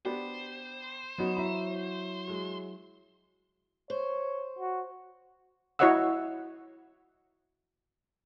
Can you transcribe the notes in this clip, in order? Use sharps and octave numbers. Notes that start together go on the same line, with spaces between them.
B3 D4 G4 C5
F#3 B3 C#4 D#4 F#4
E4 E5 A#5 B5
F#3 G#3
C5 C#5
F#4
E4 F#4 C#5 D#5 F#5 E6